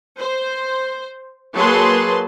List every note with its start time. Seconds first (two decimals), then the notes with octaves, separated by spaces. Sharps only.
0.20 C5
1.57 F#3 A#3 G#4 B4 A5 C6